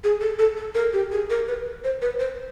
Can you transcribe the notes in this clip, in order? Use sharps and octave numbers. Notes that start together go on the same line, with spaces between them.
G#4
A4
A4
A4
A#4
G4
G#4
A#4
B4
C5
B4
C5